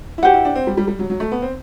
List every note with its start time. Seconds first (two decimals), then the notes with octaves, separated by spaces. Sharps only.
0.18 E4
0.23 F#4 G4 C5 F#5
0.34 E4
0.45 D4
0.55 C4
0.67 G3
0.77 G3
0.87 G3
0.99 F#3
1.10 F#3
1.20 A3
1.32 B3
1.42 C4